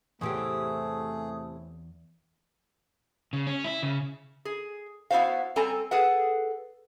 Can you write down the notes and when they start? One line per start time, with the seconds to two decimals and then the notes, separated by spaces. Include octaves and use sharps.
0.21 E2 A2 C3 E3 A3 G4 G#4
3.33 C#3
3.47 C#4
3.64 E4
3.83 C#3
4.45 G#4
5.11 B3 E4 F#4 C5 F5
5.56 G3 C4 A4 G#5 A#5
5.91 G#4 A4 B4 F#5